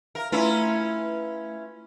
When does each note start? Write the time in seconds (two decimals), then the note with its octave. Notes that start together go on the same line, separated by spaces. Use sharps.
0.15 A#4 E5 F5 A#5
0.32 A3 C#4 E4 F4 B4